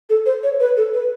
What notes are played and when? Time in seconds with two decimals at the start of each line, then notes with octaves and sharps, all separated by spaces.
0.09 A4
0.25 C5
0.43 C#5
0.60 B4
0.76 A4
0.93 B4